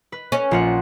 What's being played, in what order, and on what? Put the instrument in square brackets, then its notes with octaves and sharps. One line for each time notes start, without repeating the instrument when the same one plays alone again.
[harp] B4
[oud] C#4
[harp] A#1 F4 F#5